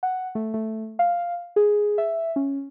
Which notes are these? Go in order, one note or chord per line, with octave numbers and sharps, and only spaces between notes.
F#5
A3
A3
F5
G#4
E5
C#4